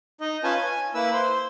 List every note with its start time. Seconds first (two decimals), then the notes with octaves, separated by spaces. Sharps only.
0.21 D#4 D#5
0.44 C#4 F4 B4 G#5 A5
0.56 G#5
0.95 A#3 E4 B4 E6
1.13 C5